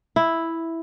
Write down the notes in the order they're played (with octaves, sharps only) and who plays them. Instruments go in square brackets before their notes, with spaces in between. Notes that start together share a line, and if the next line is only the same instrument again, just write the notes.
[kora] E4